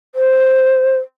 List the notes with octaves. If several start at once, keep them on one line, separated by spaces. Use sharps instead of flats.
C5